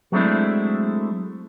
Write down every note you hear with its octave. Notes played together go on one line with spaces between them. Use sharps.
F#3 G#3 A3 C4 D4 E4